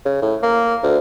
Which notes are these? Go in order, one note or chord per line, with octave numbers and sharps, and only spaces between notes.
C#3
A2
A#3
D2